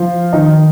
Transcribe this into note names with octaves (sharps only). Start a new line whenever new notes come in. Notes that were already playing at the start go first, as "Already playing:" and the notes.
Already playing: F3 F4
D#3 D#4